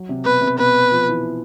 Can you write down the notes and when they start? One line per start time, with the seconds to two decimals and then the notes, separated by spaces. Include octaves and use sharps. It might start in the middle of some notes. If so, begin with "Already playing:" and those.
Already playing: F#3
0.09 C3
0.25 B2 B4
0.42 C3
0.58 B2 B4
0.92 F3
1.09 E3